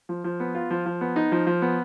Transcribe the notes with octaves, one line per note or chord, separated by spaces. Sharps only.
F3
F3
B3
F4
F3
F3
B3
D#4
F3
F3
B3